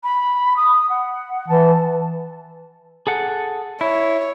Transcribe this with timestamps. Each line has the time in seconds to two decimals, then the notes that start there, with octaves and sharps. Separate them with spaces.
0.03 B5
0.56 D#6
0.89 F#5
1.48 E3 A5
3.07 G#4 A4 F#5
3.81 E4 C#5